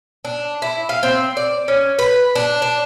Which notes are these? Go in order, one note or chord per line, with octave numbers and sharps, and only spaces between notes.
D4
E4
F5
C4
D5
C#4
B4
D4
D4